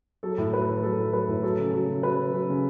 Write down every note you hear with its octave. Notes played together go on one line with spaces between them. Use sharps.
F#3 A4
A2
F#3 B4
A2
F#3 A4
A2
F#3 B4
A2
F#3 A4
C#3
F#3
C#3
F#3 B4
C#3
F#3
C#3